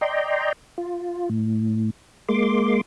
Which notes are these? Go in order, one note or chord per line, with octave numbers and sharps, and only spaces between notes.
D5 D#5 G5 A#5 C6
F4
A2
G#3 A#3 C6 D6